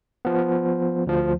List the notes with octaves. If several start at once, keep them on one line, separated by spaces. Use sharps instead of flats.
F3 B3
D2 F3